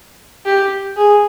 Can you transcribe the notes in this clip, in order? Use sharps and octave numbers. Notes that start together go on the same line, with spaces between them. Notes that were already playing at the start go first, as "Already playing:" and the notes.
G4
G#4